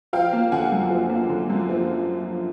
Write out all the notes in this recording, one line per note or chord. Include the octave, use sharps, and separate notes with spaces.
F3 F5 G5
A#3
D3 F#5 G#5
F#2
F3
A#3
D3
F#2
F3